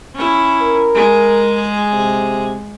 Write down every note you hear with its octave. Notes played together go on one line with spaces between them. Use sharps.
C#4 E4
A#4
G#3 G#4
C3